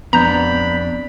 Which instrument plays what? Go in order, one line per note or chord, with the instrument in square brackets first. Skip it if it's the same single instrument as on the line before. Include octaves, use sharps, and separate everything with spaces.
[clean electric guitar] F2 D4 [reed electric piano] B3 G6 [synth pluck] A#5 [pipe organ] B5